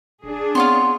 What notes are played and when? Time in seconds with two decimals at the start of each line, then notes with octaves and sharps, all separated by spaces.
0.24 D#1 D4 G#4
0.55 B3 C4 F4 C#5 C6